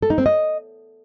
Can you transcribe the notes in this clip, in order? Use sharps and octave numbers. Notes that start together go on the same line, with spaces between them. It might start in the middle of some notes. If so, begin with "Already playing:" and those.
A4
D#4
C4
D#5